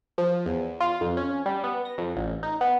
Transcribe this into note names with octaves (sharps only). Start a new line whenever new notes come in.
F3
E2
F4
F2
C#4
G3
B3
A#6
F2
A1
D#4
B3